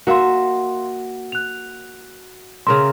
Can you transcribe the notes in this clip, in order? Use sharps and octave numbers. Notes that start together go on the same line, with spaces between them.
A#3 F#4 A#4 E5 F5 C6
F#6 F7
C#3 A#4 E5 C6